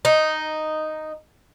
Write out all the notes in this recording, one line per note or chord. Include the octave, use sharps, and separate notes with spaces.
D#4